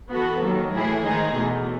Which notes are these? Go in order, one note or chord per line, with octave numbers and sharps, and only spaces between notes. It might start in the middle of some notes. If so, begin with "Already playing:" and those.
E3 B3 F#4 A4
D#2 D#3 F#3
A2 E3 A3 E4 G#4
G#2 D#3 G#3 D#4 G#4
E2 B2 A3